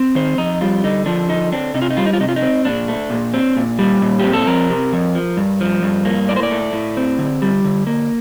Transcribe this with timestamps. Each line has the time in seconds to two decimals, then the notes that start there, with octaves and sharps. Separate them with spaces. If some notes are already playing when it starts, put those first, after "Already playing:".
Already playing: C4
0.15 D#3 C5
0.38 F2 D#4
0.61 G3 F4
0.84 D3 D#4
1.06 F3 D4
1.29 D3 D#4
1.52 C4 D4
1.74 C3 D#4
1.82 F4
1.90 D#4
1.97 G3 F4
2.06 D#4
2.13 F4
2.20 C3 D#4
2.29 F4
2.36 D#4
2.42 C4
2.65 A#2 D4
2.88 A3
3.10 A#2
3.34 C4
3.57 A#2
3.79 G3
4.02 A#2
4.19 C4 G4
4.33 A4
4.47 F2 A#4
4.69 C3
4.93 F2
5.15 F3
5.37 G2
5.61 F3
5.82 G2
6.05 A#3
6.28 A2 D5
6.36 C5
6.43 D5
6.51 A3
6.73 A2
6.97 C4
7.18 D3
7.42 G3
7.64 D3
7.87 A#3